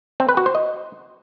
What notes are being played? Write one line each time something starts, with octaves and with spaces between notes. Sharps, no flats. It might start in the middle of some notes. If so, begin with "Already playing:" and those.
C4
B4
F#4
C5
D#5